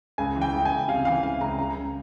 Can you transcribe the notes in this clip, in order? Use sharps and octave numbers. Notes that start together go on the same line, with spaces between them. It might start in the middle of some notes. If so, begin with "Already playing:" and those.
C#2 G#5
E3
G5
C#2
G5
G#5
C#2
C3 F5
E3 F5
C#2 F5
C#2 A#5
C#2 A#5
C#2